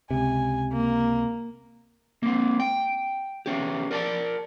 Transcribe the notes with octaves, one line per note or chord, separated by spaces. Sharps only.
C#2 C3 G#5
A#3
A#3 C4
G5
B3 C#4 G4
A#4 D5 G5 A5